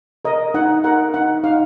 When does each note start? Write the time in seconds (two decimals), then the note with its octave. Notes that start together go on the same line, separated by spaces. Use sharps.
0.25 A#4 D#5
0.54 D#4 F#5
0.84 A#4 F#5
1.14 D#4 F#5
1.44 D#4 F5